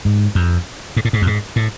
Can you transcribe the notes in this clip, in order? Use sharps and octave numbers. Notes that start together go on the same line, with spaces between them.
G#2
F2
G#2
A2
G#2
F2
G#2
A2